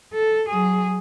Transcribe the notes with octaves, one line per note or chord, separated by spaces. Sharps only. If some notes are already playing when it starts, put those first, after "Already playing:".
A4
F#3 G#4